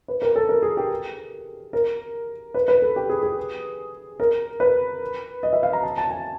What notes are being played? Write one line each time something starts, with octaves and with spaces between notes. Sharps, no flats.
B4
A#4
A4
A#4
G#4
G4
A#4
B4
B4
A4
G4
G#4
G#4
A#4
B4
D#5
E5
F5
A#5
A5
A5
G#5